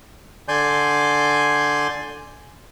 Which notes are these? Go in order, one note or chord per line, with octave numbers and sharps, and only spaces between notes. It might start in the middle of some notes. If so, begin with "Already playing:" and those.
D3 D5 G#5 C6 G6